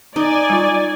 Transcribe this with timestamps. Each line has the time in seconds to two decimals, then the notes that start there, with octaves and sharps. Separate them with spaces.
0.16 D#4 D5 G#5
0.50 G3 F4